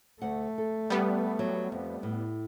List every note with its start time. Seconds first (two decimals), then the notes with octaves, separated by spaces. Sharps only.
0.22 D2 A3 F#5
0.58 A4
0.90 G3 B3
1.39 F#3
1.72 F2
2.03 A2